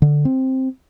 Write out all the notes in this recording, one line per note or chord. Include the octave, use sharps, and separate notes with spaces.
D3
C4